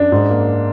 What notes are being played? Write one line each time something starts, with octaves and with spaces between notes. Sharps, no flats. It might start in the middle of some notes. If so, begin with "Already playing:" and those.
Already playing: F#2 D4
G#2
A#3